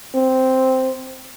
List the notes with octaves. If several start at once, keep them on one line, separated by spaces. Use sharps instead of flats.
C4